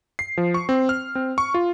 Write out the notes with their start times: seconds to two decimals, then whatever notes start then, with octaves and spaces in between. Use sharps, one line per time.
0.19 C7
0.37 F3
0.54 C#6
0.69 C4
0.89 F6
1.15 C4
1.38 C#6
1.54 F4